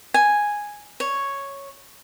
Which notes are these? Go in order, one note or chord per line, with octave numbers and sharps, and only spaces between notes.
G#5
C#5